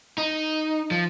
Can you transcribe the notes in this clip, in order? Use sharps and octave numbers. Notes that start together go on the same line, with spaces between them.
D#4
F3